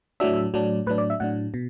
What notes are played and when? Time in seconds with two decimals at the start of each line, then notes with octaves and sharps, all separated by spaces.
0.20 A2 F#3 D4 E5
0.54 A2 F#3 D4
0.86 A2 F#3 D4 B4
0.98 D5
1.10 E5
1.20 A2 F#3 D4 F#5
1.54 B2